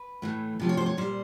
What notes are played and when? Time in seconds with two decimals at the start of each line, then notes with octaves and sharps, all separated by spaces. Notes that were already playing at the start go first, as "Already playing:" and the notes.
Already playing: B4
0.22 A2 E3 A3
0.60 C3 F3 A3
0.69 C#5
0.77 C5
0.86 C#5
0.97 A#2 G3 C5